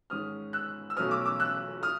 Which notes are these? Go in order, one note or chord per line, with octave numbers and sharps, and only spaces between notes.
G#2 D#3 G#3 C#4 D#6 F6
E6 F#6
E6
B1 B2 F#3 A3 C#4 D#6 F6
D6 E6
D6 E6
E6 F#6
D#6 F6